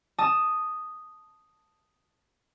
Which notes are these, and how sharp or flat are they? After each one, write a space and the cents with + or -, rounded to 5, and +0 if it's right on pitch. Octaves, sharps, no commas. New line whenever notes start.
A5 +0 D#6 +0